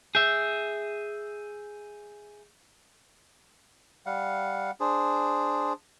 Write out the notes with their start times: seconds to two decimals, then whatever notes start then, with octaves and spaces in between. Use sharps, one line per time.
0.15 G#4 E5 G6
4.06 G3 F5 F#5
4.80 D4 G#4 C5